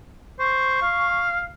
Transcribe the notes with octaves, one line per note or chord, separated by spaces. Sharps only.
C5 C#6
F5